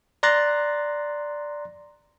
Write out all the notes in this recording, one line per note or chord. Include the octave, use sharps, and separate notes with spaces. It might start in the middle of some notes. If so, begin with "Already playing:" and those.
D5 A#5 C6 F#6 A6 A#6